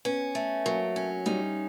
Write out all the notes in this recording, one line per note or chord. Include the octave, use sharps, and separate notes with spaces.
B3 C#4
A3
F#3 A#3
C#4
G3 D#4